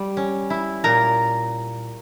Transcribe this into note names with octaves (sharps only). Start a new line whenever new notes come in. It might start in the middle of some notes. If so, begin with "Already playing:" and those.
Already playing: G3
C#4
E4
A#2 A#4 A#5